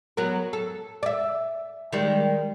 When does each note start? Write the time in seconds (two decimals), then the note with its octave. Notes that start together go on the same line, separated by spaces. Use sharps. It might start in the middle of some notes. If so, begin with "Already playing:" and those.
0.17 F#3 B3 A#4
0.53 A4
1.03 D5 E5
1.92 D#3 G3 G#3